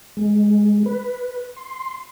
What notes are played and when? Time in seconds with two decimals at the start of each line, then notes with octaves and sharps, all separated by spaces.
0.17 G#3
0.86 B4
1.56 C6